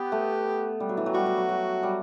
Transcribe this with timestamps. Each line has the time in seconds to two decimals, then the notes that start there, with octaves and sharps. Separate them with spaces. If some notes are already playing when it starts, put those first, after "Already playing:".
Already playing: B3 G4
0.12 A3
0.80 G3
0.89 F#3
0.97 E3
1.06 F#3
1.14 G3 F#4
1.26 F#3
1.37 F#3
1.49 F#3
1.83 G3